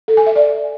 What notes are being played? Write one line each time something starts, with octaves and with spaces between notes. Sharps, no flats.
A4
G#5
E5
D5